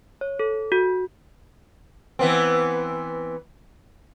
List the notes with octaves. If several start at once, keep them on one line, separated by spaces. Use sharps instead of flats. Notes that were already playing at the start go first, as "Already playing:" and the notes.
C#5
A4
F#4
E3 B3 C4